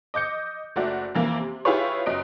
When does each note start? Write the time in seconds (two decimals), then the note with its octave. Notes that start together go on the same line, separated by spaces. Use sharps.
0.14 D#5 D6 G6 C#7
0.76 F#1 A3 F#4 D5
1.15 F2 E3 A#3
1.39 C3
1.65 E4 F4 G4 G#4 B4 C#5
2.06 F#1 F#2 D#5 D7